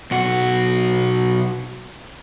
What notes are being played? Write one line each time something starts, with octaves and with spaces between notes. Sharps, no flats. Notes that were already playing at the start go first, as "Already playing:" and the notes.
B1 F#4